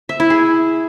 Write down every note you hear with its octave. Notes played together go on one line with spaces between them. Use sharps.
E5
E4
G#4